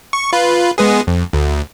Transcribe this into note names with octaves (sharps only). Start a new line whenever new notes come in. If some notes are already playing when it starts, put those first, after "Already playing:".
C#6
F4 B4
G#3 B3 G#4
F2
D2